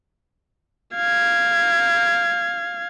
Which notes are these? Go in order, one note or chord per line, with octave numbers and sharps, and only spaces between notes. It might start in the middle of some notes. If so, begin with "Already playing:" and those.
F5 G#6